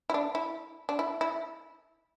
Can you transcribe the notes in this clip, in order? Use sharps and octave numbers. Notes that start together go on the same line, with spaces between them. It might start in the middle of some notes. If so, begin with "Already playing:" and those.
E4
D4
E4
D4
E4
E4